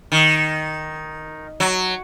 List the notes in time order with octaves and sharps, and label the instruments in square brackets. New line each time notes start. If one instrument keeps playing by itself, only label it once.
[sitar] D#3
F#3